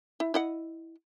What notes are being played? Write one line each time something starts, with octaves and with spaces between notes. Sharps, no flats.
E4
E4 D#5 F#5